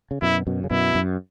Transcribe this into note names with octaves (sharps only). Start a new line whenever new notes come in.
C#3
F#2 B2 E4
F#2 B2
C#3
F#2 B2 E4
F#2